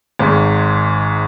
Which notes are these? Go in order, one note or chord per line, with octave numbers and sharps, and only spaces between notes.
G#1 G#2